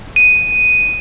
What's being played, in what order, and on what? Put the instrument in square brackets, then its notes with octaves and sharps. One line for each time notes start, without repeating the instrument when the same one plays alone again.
[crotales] D#7